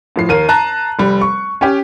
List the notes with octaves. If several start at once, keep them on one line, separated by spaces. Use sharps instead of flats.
A2 F3 C7
D#2 A#4 D#7
A5 A#5 F#6
F1 G3
C#6
C#4 G4